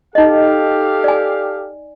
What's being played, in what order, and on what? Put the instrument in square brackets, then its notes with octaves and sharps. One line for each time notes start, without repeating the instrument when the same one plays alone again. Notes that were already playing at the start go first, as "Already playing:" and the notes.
[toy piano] D#4 D#5 [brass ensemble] G4 A4 F5
[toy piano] D5 G#5